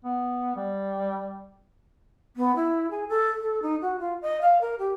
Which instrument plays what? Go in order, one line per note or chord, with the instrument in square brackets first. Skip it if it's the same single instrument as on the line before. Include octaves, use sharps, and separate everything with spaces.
[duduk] B3
G3
[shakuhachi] B3
E4
G#4
A4
A4
D#4
F#4
F4
D#5
F5
A#4
G4